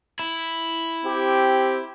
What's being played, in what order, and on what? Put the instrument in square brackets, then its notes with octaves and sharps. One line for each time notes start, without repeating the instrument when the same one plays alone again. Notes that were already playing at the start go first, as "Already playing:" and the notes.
[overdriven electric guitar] E4
[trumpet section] C4 G4